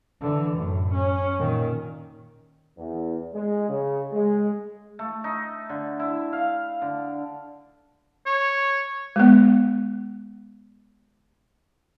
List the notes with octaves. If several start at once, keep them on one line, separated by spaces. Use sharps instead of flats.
D3 E3
F#2 A2
C#4
A#2 D#3
E2
G#3
C#3
G#3
A3
D#4
D3
E4
F5
D3
C#5
G#3 B3